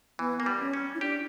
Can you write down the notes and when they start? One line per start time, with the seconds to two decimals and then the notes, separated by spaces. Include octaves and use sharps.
0.19 E3 B3
0.40 A#3
0.46 G3
0.60 C#4
0.74 C#4
0.95 E4
1.01 D4 G4